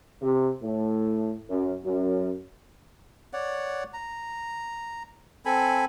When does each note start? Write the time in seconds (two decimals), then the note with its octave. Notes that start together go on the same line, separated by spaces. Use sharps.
0.21 C3
0.63 A2
1.49 F#2
1.85 F#2
3.33 C#5 D5 F#5
3.93 A#5
5.45 C4 A4 G#5 B5